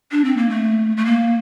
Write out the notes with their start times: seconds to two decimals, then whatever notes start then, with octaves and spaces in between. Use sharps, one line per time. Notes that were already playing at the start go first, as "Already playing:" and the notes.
0.11 D4
0.25 C4
0.37 A#3
0.50 A3
0.97 A3
1.05 A#3